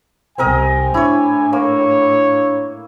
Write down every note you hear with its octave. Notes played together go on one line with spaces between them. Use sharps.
C2 C4 A#4 D#5 G#5
A2 D4 E4 C#5
A#3 C#5